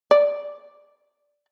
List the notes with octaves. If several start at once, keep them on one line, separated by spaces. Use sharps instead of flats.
D5